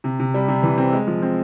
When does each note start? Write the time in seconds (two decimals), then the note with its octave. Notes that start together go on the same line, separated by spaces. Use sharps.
0.04 C3
0.19 C3
0.34 G3
0.48 C3
0.63 E3
0.78 C4
0.92 G#3
1.07 F3
1.22 C4